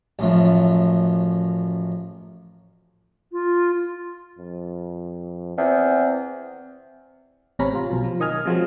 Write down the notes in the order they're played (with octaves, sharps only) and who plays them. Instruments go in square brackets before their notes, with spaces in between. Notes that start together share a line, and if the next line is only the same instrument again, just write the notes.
[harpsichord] A1 F#2 F3
[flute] F4
[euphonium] F2
[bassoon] E2 [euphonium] C4
[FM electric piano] A1 C3 C#4 A#5 B5
C3 F4
B1 B2
F3
D#3 D#5 G#5 F6
C3 F3 F#3 G#3